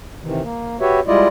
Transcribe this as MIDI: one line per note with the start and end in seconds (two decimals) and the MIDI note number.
0.23 0.42 48
0.23 0.42 51
0.23 0.42 52
0.43 0.77 58
0.81 1.00 66
0.81 1.00 67
0.81 1.00 71
0.81 1.00 73
0.81 1.00 76
1.07 1.28 55
1.07 1.28 56
1.07 1.28 64
1.07 1.28 65
1.07 1.28 74
1.07 1.28 75